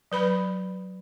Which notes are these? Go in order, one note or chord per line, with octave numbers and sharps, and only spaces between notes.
F#3 B4 B5